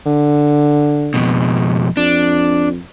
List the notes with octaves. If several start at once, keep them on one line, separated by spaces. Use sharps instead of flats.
D3
F2 B2
F2 D4